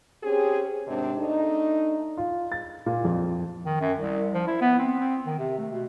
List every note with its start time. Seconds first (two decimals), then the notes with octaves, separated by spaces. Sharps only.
0.24 C4 C#4 G4 G#4
0.87 D#2 G#2 C3 C4 D4
1.18 A3 D4 D#4
2.17 F4
2.52 A6
2.86 A#2
3.05 F2
3.65 D#3
3.80 F#2
3.98 C2
4.34 F3
4.47 E4
4.61 B3
4.79 C4
5.00 C4
5.26 D#3
5.38 C3
5.58 A3
5.72 B2